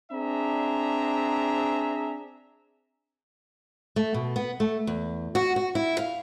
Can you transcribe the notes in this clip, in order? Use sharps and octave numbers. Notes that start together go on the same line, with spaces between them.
C4 D4 G#4 E5 A#5
A3
B2
B3
A3
E2
F#4
F#4
E4
F5